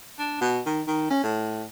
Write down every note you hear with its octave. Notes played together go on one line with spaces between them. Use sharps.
D4
B2
D#3
D#3
C#4
A2